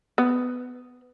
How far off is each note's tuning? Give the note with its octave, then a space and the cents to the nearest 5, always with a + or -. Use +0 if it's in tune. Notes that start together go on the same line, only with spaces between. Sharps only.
B3 +15